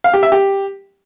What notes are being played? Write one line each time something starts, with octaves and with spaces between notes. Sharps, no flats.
F5
G4
E5
G4